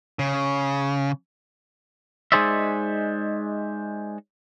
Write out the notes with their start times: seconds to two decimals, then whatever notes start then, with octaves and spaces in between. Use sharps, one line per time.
0.19 C#3
2.32 G#3 D#4 G#4 C5 D5 E5